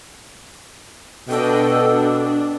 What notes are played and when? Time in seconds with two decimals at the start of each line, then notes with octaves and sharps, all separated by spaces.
1.29 B2 D4 A4 D#5 G5
1.79 D4